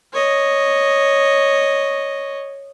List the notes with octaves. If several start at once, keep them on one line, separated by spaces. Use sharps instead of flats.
C#5 D#5